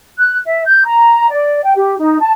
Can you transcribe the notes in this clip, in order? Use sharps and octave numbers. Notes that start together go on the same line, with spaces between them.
F#6
E5
G6
A#5
D5
G5
G4
D#4
A5